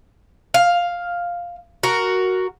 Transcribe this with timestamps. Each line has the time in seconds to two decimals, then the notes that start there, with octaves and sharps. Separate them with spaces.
0.54 F5
1.83 F#4 A#4